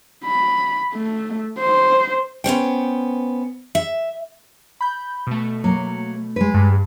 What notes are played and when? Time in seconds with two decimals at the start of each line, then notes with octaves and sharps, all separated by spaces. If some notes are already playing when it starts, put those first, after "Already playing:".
0.25 B5
0.93 A3
1.59 C5
2.44 B3 C#4 C5 G5
3.75 E5
4.81 B5 G6
5.27 B2 A3
5.64 F#3 A#3
6.36 G#3 B4
6.54 G2